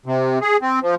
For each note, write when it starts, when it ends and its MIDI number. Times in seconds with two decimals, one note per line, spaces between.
0.06 0.39 48
0.42 0.57 68
0.62 0.79 60
0.82 0.95 53